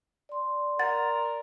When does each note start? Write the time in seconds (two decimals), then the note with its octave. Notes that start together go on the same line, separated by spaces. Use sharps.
0.29 D5 C6
0.79 A#4 F#5 A6